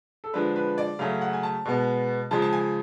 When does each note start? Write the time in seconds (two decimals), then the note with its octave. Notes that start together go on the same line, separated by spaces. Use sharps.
0.24 A4
0.34 D3 F3 G#3 D4 B4
0.56 B4
0.78 D5
0.99 C#3 F#3 A3 C#4 F5
1.21 F#5
1.33 G#5
1.43 A5
1.65 B2 G#3 B3
2.31 C#3 F3 G#3 A5
2.42 A5
2.53 G#5